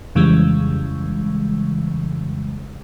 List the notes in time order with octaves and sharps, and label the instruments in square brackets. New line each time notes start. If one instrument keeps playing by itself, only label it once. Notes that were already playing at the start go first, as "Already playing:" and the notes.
[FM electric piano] F2 C#3 E3 G3 G#3